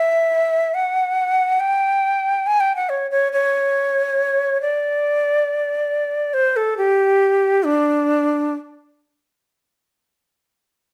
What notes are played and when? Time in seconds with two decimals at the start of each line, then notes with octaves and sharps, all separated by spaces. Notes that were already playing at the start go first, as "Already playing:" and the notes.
Already playing: E5
0.74 F#5
1.60 G5
2.47 G#5
2.60 G5
2.76 F#5
2.89 C#5
3.11 C#5
3.33 C#5
4.61 D5
6.34 C5
6.56 A4
6.77 G4
7.64 D4